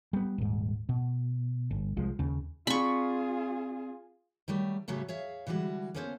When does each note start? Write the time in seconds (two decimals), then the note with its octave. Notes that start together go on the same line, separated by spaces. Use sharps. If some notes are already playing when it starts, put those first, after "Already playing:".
0.13 G3 B3
0.38 D#1 G#2
0.89 B2
1.71 G1
1.97 C2 F3 G#3
2.19 D#2 C#3
2.67 C4 F4 G#4 D5 B5 C#6
4.48 D#3 F#3 G3 A3
4.88 A2 C#3 F#3 G3 A3
5.08 G#4 C#5 E5 F5
5.47 D3 E3 G3 G#3 F#4
5.94 A#3 B3 C#4 A4 B4 C5